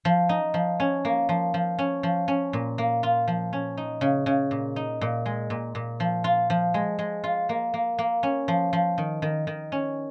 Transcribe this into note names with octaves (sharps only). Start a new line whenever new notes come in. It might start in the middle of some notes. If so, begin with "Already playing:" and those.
F3
D#4
F3
C#4
A#3
F3
F3
C#4
F3
C#4
A#2
A#3
F4
F3
C#4
D#4
C#3
C#3
A#2
D#4
A#2
G#3
A#2
A#2
F3
F4
F3
G#3
G#3
F4
A#3
A#3
A#3
C#4
F3
F3
D#3
D#3
D#3
C#4